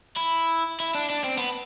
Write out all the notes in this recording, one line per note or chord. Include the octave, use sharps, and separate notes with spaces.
E4
E4
D4
D4
C4
B3